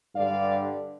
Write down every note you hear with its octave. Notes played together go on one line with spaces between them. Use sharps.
G2 D3 G3 D5 F5